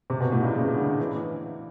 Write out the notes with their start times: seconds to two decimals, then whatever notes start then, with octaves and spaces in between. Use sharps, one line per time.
0.10 C3
0.20 B2
0.32 A2
0.43 A#2
0.55 C#3
0.76 D3
0.99 E3